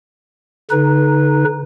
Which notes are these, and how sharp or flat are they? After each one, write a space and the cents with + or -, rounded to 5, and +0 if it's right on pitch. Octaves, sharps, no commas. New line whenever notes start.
D3 -40 D#4 +0 B4 -15